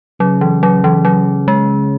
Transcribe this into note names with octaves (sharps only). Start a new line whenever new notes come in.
C#3 F#3
E3
F#3
E3
F#3
G#3